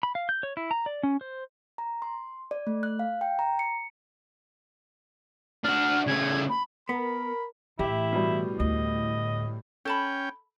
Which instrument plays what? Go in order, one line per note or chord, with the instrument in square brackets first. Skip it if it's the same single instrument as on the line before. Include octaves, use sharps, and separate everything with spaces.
[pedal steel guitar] B5
F5
G6
C#5
E4
A#5
D5
C#4
C5
[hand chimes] A#5
C6
D5
A3
F#6
F5
G5
A#5
C#7
[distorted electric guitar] D4 F#4 [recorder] F6
[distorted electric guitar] C#3 A3 [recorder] G#6
[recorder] B5
[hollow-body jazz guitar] B3 [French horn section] A#4 [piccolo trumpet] B5
[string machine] A2 [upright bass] E3 [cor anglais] E4 [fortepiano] G4 E5
[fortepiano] B2 G3
[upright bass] D2 [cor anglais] D#5
[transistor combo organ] C#4 G5 [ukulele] A4 A5 B5